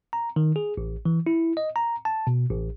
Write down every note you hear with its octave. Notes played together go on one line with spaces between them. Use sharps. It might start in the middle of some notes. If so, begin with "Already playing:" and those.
A#5
D#3
G#4
A1
E3
E4
D#5
A#5
A5
B2
A1